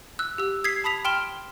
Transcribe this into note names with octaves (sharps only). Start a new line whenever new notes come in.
E6 F#6
G4 E6
D#6 G#6 B6 C7
A5 B5 D#6 B6 F7
G5 C6 F6 D7 E7 G7